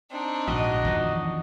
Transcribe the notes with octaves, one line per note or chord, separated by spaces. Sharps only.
C4 D4 D#4
A#1 G#2 F#4 D#5
E2 D#3 F3